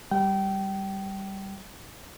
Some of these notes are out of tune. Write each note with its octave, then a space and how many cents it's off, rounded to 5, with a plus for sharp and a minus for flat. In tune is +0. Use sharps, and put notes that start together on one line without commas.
G3 +0 G5 -25